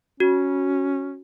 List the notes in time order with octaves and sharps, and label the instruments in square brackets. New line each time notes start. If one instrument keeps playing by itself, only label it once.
[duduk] C#4 [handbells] F#4